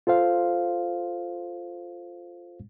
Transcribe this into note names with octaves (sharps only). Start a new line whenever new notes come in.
F4 A4 C5 F5